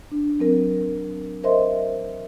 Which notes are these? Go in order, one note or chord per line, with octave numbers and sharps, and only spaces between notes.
D4
F#3 C4 A#4
A#4 C5 D#5 E5 C6